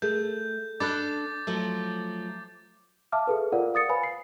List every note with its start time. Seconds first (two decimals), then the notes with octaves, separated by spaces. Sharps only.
0.02 A3 G#4 A#4 G6
0.80 D4 A4 B5 D6 F#6 A6
1.47 F3 F#3 A3
3.12 E5 F5 A5 D6 F6
3.27 G#4 A4 B4
3.52 F4 A#4 C5 D5 F5 F#5
3.74 F5 D#6 A6 C#7
3.89 B4 C5 F5 G#5 B5
4.03 C7